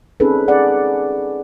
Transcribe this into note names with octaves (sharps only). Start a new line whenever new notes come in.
C4 C#4 D#4 G#4 A4 B4
G#4 D5 F#5